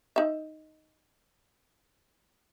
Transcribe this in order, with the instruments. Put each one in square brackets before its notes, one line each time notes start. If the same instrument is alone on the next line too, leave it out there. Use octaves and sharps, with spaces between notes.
[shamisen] D#4 E5